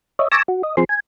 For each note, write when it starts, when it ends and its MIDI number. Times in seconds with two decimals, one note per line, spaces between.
0.19 0.28 73
0.19 0.28 75
0.19 0.28 76
0.32 0.43 80
0.32 0.43 81
0.32 0.43 85
0.32 0.43 86
0.32 0.43 88
0.32 0.43 94
0.48 0.62 66
0.63 0.76 75
0.77 0.84 53
0.77 0.84 60
0.77 0.84 68
0.77 0.84 84
0.89 1.00 80